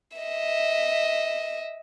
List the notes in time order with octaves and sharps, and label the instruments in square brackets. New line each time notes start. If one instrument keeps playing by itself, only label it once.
[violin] D#5 E5